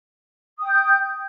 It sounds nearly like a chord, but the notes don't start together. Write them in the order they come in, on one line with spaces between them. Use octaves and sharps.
D#6 G5 G6